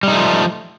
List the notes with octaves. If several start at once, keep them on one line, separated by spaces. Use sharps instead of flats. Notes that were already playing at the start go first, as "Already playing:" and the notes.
F3 G3 A3 D#4